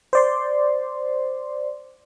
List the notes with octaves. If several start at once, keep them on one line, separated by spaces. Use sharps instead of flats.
C5 D5 C6